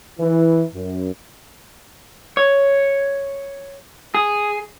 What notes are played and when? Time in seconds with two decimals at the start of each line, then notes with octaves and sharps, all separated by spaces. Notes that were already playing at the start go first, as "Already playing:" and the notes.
0.18 E3
0.74 F#2
2.37 C#5
4.15 G#4